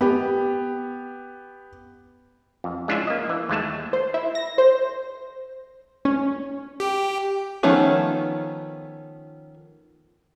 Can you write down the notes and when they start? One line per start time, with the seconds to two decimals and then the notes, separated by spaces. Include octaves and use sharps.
0.01 B3 G4
2.64 F2
2.88 G#3 C#4 D4 E4 F4 E5
3.07 A#3 D#5
3.29 E3
3.49 D#2 G#3 A3 A5
3.93 C5
4.14 E4
4.35 A#6
4.58 C5
6.05 C#4
6.80 G4
7.63 D#3 F3 A3 B3 C#4